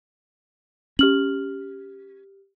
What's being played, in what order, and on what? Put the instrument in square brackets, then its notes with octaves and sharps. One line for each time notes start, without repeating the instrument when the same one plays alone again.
[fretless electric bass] C#4 [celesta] G4 F6 F#7